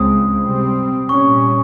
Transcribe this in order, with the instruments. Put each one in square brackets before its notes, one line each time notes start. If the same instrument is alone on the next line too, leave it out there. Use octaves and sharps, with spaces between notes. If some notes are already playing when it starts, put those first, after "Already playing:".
Already playing: [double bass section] C#2 C#3 G#3 C4 [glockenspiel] D#6
[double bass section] C3 G3 C4
[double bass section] A#2 G3 C#4 [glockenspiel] C#6